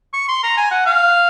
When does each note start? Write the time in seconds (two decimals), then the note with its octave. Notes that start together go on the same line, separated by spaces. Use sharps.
0.13 C#6
0.28 C6
0.43 A#5
0.57 G#5
0.71 F#5
0.86 F5